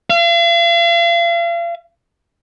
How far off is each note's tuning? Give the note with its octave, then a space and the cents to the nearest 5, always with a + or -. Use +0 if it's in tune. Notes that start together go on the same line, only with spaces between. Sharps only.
F5 -40